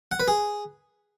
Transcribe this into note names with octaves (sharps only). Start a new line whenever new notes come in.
F#5
B4
G#4